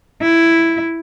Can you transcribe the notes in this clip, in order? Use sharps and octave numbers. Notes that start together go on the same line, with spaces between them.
E4